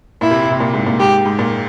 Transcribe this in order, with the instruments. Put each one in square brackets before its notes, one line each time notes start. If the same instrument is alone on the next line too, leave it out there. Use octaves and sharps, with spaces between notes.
[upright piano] A#2 [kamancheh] E4
[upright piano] C3
C3
A#2
G#2
A#2
[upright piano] G#2 [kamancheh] G4
[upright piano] G#2
A#2